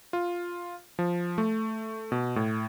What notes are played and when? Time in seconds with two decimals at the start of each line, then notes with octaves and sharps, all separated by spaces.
0.13 F4
0.99 F3
1.38 A3
2.12 B2
2.36 A2